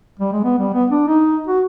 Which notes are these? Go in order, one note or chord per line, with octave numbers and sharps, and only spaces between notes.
G3
G#3
B3
G3
B3
D4
D#4
F#4